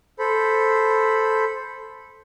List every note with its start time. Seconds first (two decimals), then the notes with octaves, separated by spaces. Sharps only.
0.19 A4 C5 B5